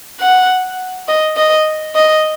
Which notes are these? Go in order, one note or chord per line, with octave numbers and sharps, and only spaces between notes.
F#5
D#5
D#5
D#5